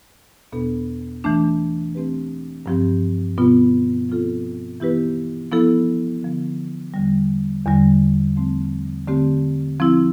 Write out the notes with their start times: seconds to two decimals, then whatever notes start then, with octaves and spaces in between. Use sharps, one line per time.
0.52 E2 B2 B3 D4 A4
1.24 E3 A3 D4
1.95 E3 A3 C4 G4 B4
2.66 G2 F3 C4 G4
3.38 B2 B3 F4
4.09 F3 C4 F4 A4
4.80 E3 B3 E4 G4 B4
5.51 F3 B3 E4 A4
6.22 D3 F3 B3
6.94 E2 D3 G3
7.65 E2 D3 G3
8.36 F3 A3 C4
9.08 D3 A3 C4 G4
9.80 F3 C4 E4